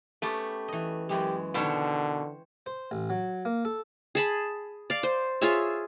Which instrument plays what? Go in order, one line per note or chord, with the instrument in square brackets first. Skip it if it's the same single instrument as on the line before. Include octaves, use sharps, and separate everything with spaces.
[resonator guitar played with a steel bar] A3 [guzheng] B3 C#4 G4
[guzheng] E3 D#5
[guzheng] F#2 E3 G#3 [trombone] G4
[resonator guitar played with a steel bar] B2 D#3 [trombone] D3 [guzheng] C5 C#5 G5
[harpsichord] C5
A1
F#3
A#3
A4
[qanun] G#4 A5 B5
D5 F5
C5
F4 G#4 C#5 E5